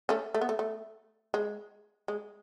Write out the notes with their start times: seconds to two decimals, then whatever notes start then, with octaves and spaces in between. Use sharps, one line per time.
0.09 A3 C#4
0.34 A3
0.41 B3
0.49 A3
0.59 A3
1.34 G#3
2.08 G#3